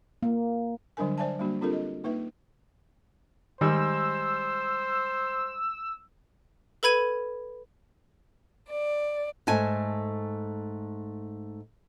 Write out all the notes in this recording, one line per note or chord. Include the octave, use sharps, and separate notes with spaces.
A#3
D3 F#3 G3 D4 A#4 G#5
C5 D5 E5 G#5 A5
G3 A#3 D4 F#4
C4 D4 F4 G4 A4 A#4
D#5
A#3 D#4 B4 E5
D#3 G3 G#3 C5 E6
A4 B4 B5 G#6 D#7
D5
G#2 A3 G#5 A5